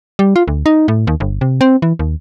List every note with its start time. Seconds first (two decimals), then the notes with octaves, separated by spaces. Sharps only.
0.19 G3
0.36 F4
0.48 D2
0.66 D#4
0.88 A2
1.07 D#2
1.20 G1
1.41 C3
1.61 C4
1.82 E3
1.99 D#2